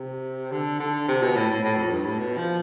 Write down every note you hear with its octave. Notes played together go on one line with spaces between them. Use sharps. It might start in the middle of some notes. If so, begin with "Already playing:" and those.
Already playing: C3
D3
D3
C3
B2
A2
A2
A2
F2
G2
A2
B2
F3